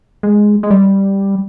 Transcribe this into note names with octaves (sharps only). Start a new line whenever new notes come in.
G#3
G#3
G3